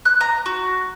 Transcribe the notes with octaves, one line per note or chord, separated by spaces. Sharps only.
F#6
A#5
F#4